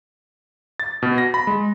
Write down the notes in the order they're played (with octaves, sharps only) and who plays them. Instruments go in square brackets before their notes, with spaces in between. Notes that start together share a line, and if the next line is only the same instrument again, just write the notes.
[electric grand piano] A6
B2
A#6
B5
G#3